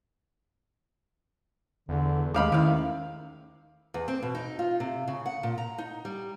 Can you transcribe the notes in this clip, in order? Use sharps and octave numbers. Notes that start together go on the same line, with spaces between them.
E2 D3
D#2 D#3 G#3 A3 C#4 F5 B5 D6
C3 D#3 E4 F5
E2
C4
B2
D#4
F4
C3
C#3
F#5
A#2
A#5
D#4
G3